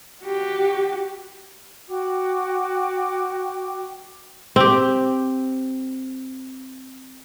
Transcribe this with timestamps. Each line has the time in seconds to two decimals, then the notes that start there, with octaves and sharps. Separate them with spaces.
0.23 F#4 G4
1.90 F#4 G5 D6
4.56 C4 G4